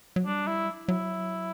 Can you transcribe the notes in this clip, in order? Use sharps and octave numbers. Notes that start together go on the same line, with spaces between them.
F#3
G3 D4
E4
F#3 E4